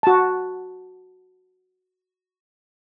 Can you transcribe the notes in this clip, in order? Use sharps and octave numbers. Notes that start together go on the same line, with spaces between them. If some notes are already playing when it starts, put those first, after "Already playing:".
F#4 A5